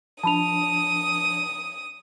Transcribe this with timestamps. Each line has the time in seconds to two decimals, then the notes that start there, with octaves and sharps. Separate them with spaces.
0.23 F3 D4 A5 B5 D#6 F7